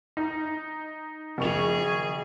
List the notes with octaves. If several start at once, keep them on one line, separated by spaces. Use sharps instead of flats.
D#4
F#1 D#3 F3 G#4 C#6 F7